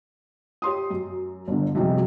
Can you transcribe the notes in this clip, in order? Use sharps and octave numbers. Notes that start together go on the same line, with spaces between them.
G4 C#5 C6 D#6
F#2
G1 D3
F#2 C3 F3 G3 G#3